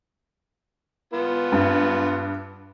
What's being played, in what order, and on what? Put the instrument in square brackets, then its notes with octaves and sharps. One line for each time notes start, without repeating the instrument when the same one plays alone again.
[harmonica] B3 F4
[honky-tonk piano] G2